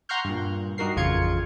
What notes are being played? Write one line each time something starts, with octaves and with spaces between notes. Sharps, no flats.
F#5 A#5 C6 C#6 F6 G6
G2 A#2
G2 D#4 F#4 A#4 C7
A1 F2 C#3 F4 G#6 C#7